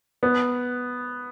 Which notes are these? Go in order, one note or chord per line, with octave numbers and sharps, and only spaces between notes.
B3